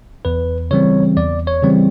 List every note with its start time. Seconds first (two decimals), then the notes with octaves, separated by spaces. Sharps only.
0.25 E2 B4
0.71 C#3 E3 G3 C4 C#5
1.17 E2 D5
1.47 C#5
1.62 C#3 E3 G3 C4